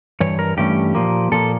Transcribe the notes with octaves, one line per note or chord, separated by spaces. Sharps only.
G2 E3 C#5
A#4
G2 E3 A3 C#4 G4
A#2 F3 A#3
A#2 F3 A#3 A4